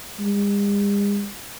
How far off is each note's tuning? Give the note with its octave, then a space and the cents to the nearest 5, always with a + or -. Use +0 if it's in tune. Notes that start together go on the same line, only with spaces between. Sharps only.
G#3 -45